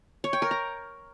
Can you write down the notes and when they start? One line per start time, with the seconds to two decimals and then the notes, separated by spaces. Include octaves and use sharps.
0.24 C#5
0.33 G5
0.42 A#4
0.51 A#5